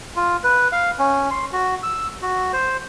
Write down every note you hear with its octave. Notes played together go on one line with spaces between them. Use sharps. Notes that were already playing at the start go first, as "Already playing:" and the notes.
F4
B4
F5
C#4
C6
F#4
E6
F#4
C5